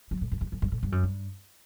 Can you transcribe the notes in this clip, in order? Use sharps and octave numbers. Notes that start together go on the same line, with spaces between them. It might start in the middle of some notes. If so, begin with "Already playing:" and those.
F#3
A2
F#2
E2
F#2
G2
A2
G2
F#2
G2